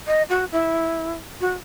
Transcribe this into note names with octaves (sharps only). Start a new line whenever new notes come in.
D#5
F#4
E4
F#4